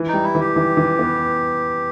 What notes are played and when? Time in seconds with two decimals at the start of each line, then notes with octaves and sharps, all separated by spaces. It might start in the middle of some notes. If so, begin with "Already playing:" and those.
Already playing: E3
0.08 D#4
0.14 G3
0.24 E4
0.35 E3
0.40 G4
0.56 E3
0.77 E3
0.99 B3